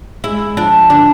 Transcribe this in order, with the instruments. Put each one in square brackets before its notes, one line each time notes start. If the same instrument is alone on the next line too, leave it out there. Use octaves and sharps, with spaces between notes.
[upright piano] G#3 [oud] E4
[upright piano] F3 [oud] D4
[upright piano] D3 [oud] D4